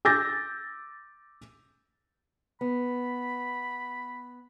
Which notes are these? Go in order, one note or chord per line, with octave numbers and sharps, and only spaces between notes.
D6 E6 G6 A6 A#6
B3 B5